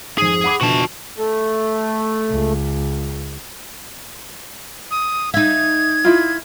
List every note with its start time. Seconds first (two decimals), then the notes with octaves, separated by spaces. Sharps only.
0.18 F2 G#2 G#4
0.44 F#5 B5 D6
0.61 B2 D3 F3 F#4 A5
1.17 A3
2.31 C#2
4.91 D#6
5.34 D#4 E5 G#6
6.04 E4 F4